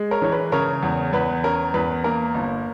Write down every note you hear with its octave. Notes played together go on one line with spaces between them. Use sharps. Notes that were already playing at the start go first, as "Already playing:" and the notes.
Already playing: G#3
A#4 C#5
E3 C#5
B4
C#3 A#4 C#5
E2
E2 B4
C#4 A#4
E2 B4
A#3 A#4
G1